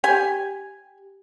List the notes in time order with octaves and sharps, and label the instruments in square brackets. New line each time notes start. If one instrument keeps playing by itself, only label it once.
[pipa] G4 G#5